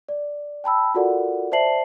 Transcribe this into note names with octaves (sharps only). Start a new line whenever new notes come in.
D5
G5 A5 B5 E6
F4 F#4 A4 A#4 D5 F#5
C5 D5 E5 A5 C7 F#7